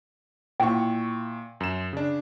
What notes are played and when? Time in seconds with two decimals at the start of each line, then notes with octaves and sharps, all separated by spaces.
0.60 A#2 E4 G5 C#6
1.60 F#2 E7
1.93 C#3 D4